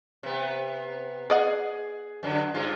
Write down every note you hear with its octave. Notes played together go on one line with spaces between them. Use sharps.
C3 B3
G#4 D5 D#5 F#5
F#2 D3 F#3
G2 G#3 F4